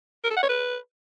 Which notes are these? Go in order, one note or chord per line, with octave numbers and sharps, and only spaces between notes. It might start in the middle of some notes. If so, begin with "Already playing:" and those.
A#4
A4
F#5
C#5
B4